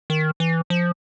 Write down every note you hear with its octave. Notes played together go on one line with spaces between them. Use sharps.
D#3
E3
F3